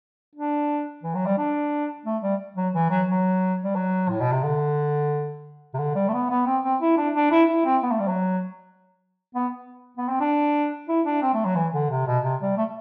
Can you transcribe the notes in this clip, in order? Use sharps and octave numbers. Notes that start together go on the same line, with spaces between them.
D4
E3
F#3
G3
D4
A3
G3
F#3
E3
F#3
F#3
G3
F#3
A2
B2
C3
D3
C3
D3
G3
A3
B3
B3
C4
C4
E4
D4
D4
E4
E4
C4
B3
A3
G3
F#3
B3
B3
C4
D4
E4
D4
C4
A3
F#3
E3
D3
C3
B2
C3
G3
A3